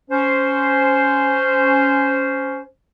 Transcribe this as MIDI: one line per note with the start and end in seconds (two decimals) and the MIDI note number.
0.10 2.62 61
0.10 2.62 72